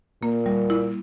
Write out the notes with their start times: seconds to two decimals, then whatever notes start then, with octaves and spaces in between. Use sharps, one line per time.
0.22 A#2 A#3
0.46 G3
0.70 E4